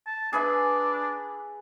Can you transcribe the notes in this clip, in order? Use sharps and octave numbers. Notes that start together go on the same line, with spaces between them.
A5
D4 G#4 B4 E5